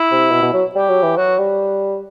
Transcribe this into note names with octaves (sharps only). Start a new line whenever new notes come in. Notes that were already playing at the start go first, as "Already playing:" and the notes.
Already playing: E4
C3
B2
B2
F#3
G3 G4
F#3
E3
F#3 F#4
G3